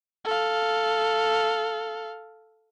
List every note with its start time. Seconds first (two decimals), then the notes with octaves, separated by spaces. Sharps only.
0.25 A4 F5